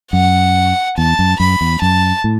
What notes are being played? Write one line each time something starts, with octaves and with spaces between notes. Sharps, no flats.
F#2 F#5
E2 A5
F#2
F#2 B5
E2
F#2 A5
A2